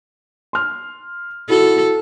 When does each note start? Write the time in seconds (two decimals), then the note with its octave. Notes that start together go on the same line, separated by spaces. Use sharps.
0.53 C6 F6
1.49 E4 F#4 A4